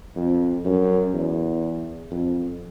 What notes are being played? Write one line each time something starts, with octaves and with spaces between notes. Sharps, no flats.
F2
F#2
E2
F2